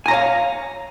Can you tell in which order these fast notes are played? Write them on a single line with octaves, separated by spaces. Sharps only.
G#5 A#5 C#5 F5